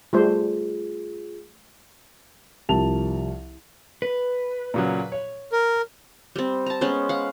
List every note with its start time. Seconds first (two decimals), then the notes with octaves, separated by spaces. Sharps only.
0.13 G3 A3 F4 G#4 C5
2.69 C2 F3 G4 A#4 A5 F7
4.02 B4
4.74 A#2 C#3 F#3
5.12 C#5
5.52 A#4
6.36 G3 C4
6.66 A5 A#5
6.81 G#3 B3 C#4 C5
7.09 F5 F#5